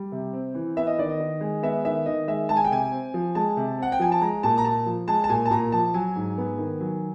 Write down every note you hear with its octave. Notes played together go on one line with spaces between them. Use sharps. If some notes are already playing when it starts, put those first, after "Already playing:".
Already playing: G3
C3
C4
E3
B3 E5
D#5
D#3 D5
D#5
D#3
G#3
B3 E5
D#3 E5
D#3 D#5
G#3 E5
G#3 A5
G#5
G5
C3 G#5
C4
F3
G#3 A5
C3
C4 F#5
G5
F3 G#5
A5
G#3 A#5
A#2 A5
A#5
A#2 A5
F3
G#3 A5
A5
A#2 G#5
A5
A#2 A#5
F3 A5
F#3 G#5
G#2
B3
D#3
F#3